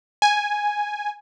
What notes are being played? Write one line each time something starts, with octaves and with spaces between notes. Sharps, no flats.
G#5